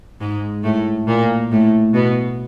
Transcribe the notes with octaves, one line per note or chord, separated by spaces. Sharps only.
G#2 G#3
A2 A3
A#2 A#3
A2 A3
B2 B3